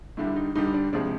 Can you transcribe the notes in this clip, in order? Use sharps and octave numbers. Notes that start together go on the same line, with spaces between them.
G2 D3 G3 E4
D#4
G2 D3 G3 D#4
D4
C#2 C3 F3 G#3 D4